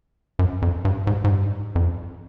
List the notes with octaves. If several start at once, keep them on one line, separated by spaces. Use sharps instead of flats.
F#2
F2
G2
G#2
G#2
G2
F2